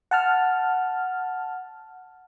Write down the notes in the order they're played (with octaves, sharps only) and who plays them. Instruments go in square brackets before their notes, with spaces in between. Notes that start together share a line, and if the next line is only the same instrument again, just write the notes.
[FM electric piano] F#5 A5 F6